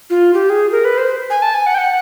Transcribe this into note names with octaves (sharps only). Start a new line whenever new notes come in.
F4
G4
G#4
A#4
B4
C5
G#5
A5
G#5
F#5
G5
F#5